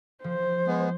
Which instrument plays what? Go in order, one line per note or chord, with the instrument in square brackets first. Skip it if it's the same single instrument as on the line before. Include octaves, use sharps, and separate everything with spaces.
[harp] F3 [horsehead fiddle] C5
[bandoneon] G#3 B3